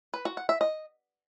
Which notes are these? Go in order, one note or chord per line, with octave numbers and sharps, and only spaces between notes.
B4
F#4
F#5
E5
D#5